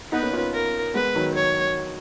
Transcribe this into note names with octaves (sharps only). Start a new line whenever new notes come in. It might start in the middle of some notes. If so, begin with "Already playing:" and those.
B3 D#4 B4
A#3 C#4
C#4 F4
A#4
G#3 B3 B4
D#3 F#3
C#5